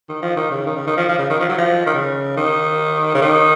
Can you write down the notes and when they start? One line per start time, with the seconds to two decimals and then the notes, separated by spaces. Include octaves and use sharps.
0.09 D#3
0.22 F3
0.36 D#3
0.51 C#3
0.66 D#3
0.76 C#3
0.87 D#3
0.97 F3
1.09 F3
1.18 C#3
1.30 D#3
1.40 F3
1.49 F#3
1.58 F3
1.86 D#3
1.94 C#3
2.37 D#3
3.14 C#3
3.22 D#3